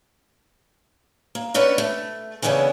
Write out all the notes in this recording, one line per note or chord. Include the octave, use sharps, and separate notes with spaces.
A#3
A3 C#4 D4 B4 F#5
A3
C#3 E3 G3 B3 C#4 D4